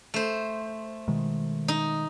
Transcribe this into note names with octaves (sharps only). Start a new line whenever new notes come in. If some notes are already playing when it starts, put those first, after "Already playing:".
A3 C5
B2 D#3 G#3
D#4